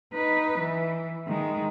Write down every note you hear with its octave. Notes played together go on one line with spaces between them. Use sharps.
D#4 B4
E3
D#3 G#3